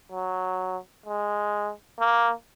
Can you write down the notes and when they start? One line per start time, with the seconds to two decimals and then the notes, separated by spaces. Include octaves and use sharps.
0.12 F#3
1.06 G#3
1.99 A#3